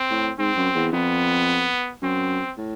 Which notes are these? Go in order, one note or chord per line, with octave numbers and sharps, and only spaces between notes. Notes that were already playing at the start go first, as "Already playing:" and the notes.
Already playing: C4
A2
G#2 C4
F#2
E2
F2 B3
F#2 C4
A2